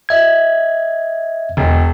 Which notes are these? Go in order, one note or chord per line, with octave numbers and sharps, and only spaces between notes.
D#5 E5 G#6
E1